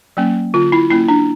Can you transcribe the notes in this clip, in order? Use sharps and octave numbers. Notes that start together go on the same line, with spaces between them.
F#3 A#3 C#4
D3 F4
E4
F#3 A#3 C#4 E4
D4